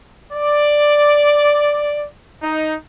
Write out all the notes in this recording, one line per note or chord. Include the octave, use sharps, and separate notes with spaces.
D5
D#4